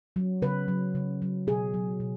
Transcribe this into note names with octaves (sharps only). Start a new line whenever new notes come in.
F#3
C#3 B4
F#3
C#3
F#3
B2 G#4
F#3
B2